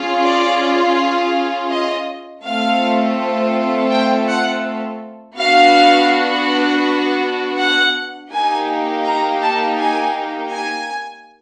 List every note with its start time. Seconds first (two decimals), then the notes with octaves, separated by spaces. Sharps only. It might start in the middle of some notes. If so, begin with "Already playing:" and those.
Already playing: C#4 F4 G#4
0.23 D5
1.70 D#5
2.43 A3 C4 F4 A4 F5
3.90 G5
4.27 F#5
5.37 B3 D4 F#4 F5
7.58 F#5
8.31 A#3 D#4 G4 G#5
9.04 A#5
9.42 A5
9.78 G#5
10.51 G#5